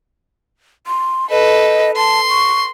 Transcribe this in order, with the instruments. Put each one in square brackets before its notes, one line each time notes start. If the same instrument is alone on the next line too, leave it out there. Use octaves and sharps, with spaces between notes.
[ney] C6
[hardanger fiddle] A4 B4 [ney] D#5
[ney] A5 [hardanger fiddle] C6
[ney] C#6